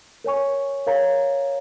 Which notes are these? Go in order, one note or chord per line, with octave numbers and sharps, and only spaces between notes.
A#4 C#5 G#5 C#6
A#4 C#5 F5 A#5